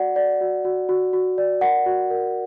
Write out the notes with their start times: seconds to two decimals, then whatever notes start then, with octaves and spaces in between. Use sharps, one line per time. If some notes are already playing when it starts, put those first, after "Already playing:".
Already playing: F#4 D5 F#5
0.16 D5
0.41 F#4
0.65 F#4
0.89 F#4
1.13 F#4
1.38 D5
1.61 A#4 F#5
1.86 F#4
2.10 A#4